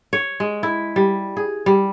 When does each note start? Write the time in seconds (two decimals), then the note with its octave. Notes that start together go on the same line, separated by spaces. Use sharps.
0.13 C#5
0.40 G#3
0.63 E4
0.96 G3
1.37 G#4
1.66 G3